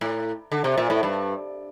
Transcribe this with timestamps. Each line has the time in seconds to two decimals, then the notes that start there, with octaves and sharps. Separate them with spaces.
0.01 A2
0.52 D3
0.64 C3
0.78 A#2
0.90 A2
1.03 G2